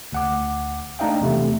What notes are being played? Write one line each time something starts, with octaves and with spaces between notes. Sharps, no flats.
D2 F#5 D6
A3 D4 D#4 D#5 F5 G5
E2 C3 A3